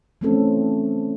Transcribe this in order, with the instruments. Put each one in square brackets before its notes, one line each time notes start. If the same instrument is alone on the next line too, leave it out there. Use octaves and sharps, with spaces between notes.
[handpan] E3 F3 A3 C4 C#4 A4